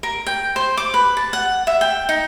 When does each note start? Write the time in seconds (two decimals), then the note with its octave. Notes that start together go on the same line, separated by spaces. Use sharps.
0.03 A#4
0.27 G5
0.56 C5
0.77 D6
0.94 B4
1.17 A5
1.33 F#5
1.67 E5
1.81 G5
2.09 D#4